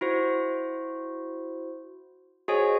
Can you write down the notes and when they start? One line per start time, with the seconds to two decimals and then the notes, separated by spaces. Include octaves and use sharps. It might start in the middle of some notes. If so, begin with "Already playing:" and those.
0.01 E4 F#4 C5
2.48 F#4 G#4 C5 C#5 D#5 G#5